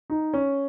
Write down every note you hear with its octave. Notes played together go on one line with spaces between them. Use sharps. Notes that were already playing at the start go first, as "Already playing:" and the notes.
D#4
C#4